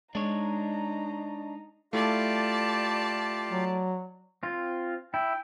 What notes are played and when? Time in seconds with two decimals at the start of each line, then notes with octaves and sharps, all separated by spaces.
0.15 G#3 D4 D#4 C#5 A#5
1.93 A3 E4 F4 G4 D5 F5 A5
3.51 F#3
4.43 C4 F4
5.14 E4 G5